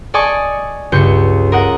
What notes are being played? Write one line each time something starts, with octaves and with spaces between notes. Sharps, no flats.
D5 D#5 G#5 A5 C#6
C#2 G2 G6 C#7
A#4 D#5 F#5